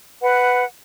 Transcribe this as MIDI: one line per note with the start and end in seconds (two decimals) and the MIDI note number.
0.21 0.64 71
0.21 0.64 78